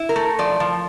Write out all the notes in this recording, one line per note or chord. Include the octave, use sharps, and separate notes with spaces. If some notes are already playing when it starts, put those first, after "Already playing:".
Already playing: E4
A#4
A3
F3 D5
F3